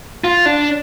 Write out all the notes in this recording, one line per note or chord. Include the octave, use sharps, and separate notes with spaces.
F4
D4